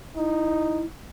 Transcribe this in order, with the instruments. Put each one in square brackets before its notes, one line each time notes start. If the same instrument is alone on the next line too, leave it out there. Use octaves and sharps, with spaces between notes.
[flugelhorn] D#4 [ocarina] E4